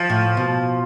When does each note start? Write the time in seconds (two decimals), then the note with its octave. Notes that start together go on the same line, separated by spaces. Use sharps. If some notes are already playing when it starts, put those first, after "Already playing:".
Already playing: F3
0.10 A2
0.37 B2